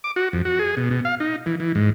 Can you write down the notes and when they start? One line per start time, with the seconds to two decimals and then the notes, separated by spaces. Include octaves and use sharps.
0.04 D6
0.16 F#4
0.33 F2
0.45 F#4
0.59 G#4
0.77 B2
0.90 B2
1.05 F5
1.20 D#4
1.46 E3
1.60 E3
1.75 G#2